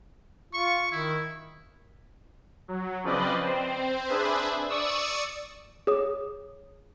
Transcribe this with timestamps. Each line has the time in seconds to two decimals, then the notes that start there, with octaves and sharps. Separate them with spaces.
0.53 F4 C#6
0.92 D#3 E4
2.68 F#3
3.04 C#3 F3 C4 B4 D5 D#5
3.44 C4 C5
4.08 D4 G#4 B4 C5 E5
4.69 D5 C#6 D#6 E6
5.87 G#4 C#5 D#6